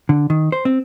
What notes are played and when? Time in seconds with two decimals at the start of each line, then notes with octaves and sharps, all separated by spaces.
0.09 D3
0.30 D#3
0.52 C5
0.65 C4